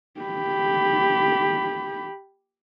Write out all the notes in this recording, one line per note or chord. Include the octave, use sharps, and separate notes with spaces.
G4 B5